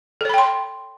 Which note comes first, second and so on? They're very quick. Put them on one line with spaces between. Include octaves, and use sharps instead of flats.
A4 C#5 B5 G5 C6